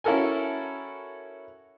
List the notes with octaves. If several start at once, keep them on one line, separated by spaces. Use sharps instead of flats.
C#4 E4 F#4 A4 A#4 G#5